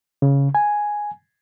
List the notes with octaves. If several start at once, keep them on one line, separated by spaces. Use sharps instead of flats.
C#3
G#5